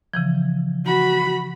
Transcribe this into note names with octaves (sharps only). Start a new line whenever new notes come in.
C#3 E3 F3
F#4 B5